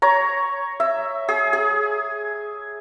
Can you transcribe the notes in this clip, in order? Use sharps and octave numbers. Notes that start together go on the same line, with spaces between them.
C#5 A#5
E5
G#4
G#4